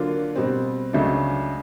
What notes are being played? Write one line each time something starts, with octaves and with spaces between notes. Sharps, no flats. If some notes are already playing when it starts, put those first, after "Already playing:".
Already playing: D3 F#3 A#3 D4 F4
B2 G3 C4
C#2 C#3 F#3 A3 D4